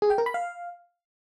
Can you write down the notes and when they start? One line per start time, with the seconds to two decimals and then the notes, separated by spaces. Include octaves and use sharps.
0.02 G#4
0.10 G5
0.18 A#4
0.26 B5
0.34 F5